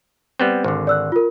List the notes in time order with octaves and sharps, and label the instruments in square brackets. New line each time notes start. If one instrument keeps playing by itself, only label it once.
[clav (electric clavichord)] G3 B3 C4
[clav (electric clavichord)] G#1 D3 [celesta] C5
[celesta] D5 E6 F#6
F4 A#4